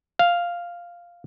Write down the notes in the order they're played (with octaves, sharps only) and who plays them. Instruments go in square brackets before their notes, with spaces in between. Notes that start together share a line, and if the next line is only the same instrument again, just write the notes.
[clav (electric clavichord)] F5